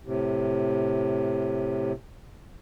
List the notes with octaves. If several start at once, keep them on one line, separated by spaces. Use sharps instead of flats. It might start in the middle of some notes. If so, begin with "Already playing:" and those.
A2 C3